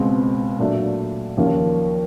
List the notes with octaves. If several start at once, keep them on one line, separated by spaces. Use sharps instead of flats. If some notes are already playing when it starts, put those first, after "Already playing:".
Already playing: C#2 B2 G#3 C4
A#2 F#3 A3 D4
D#2 C#3 F3 A#3 C#4